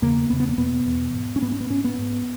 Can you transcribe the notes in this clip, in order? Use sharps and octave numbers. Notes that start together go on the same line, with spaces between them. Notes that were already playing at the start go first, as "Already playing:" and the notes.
E2 C#3 A#3
E2 C#3 B3
B3
A#3
E2 B2 B3
E2 B2
G#2
C#4
G#2 B3
C#4
B3
G#2 C#4
B3
G#2